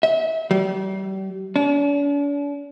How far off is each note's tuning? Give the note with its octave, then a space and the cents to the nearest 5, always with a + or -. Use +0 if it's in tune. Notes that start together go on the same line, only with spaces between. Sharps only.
E5 -35
G3 -35
D4 -45